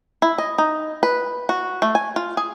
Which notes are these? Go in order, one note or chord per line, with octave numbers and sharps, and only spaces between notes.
E4
D#5
D#4
B4
F#4
A3
G#5
F4
G#4